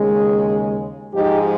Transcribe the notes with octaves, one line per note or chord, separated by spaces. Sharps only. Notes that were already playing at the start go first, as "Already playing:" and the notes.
Already playing: D#2 C#3 G#3
G#2 F3 G#3 D#4 G4